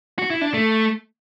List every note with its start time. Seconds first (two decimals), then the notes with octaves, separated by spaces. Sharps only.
0.18 F#4
0.30 E4
0.42 D4
0.54 A3